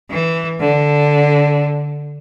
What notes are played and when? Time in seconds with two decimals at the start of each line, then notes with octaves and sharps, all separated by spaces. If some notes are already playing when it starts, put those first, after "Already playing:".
0.10 E3
0.60 D3